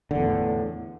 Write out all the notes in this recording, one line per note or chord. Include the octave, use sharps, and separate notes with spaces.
E2 A2 D3